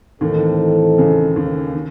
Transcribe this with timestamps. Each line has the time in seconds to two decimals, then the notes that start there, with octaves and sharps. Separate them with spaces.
0.21 D#2 A2 D#3 E3 C4 D#4 A4
0.98 C#2 C#3
1.36 D#2 D#3
1.74 D#3